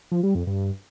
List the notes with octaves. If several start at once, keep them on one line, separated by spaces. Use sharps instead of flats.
F3
G3
F2
G2